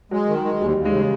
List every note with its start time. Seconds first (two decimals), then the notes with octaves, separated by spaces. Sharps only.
0.11 F#3 G#3
0.28 D#3
0.44 G#3
0.61 D#2 G3
0.77 D#2
0.85 G#3
0.93 C#3